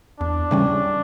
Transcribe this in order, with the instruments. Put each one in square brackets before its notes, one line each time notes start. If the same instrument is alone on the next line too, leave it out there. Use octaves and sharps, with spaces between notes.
[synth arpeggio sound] E2 [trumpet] D4
[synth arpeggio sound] C#3 E3 G3 C#4